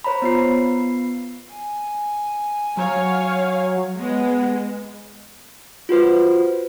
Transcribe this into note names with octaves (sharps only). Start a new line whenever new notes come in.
C5 C#5 A#5 B5
B3 F4 C7
G#5
F#3 C#5 F5
G#3 B3
F4 F#4 B4 C5